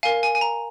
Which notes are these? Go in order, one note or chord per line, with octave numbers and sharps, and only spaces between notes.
A#4 F5 G#5
G#5
G#5
A#5